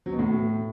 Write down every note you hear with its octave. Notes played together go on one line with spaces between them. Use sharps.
F#3
B2
A2